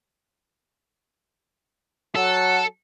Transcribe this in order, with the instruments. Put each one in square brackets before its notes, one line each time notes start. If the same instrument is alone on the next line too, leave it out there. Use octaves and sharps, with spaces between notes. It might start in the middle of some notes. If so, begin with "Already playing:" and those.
[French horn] F#3 [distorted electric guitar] A4 [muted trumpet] F#5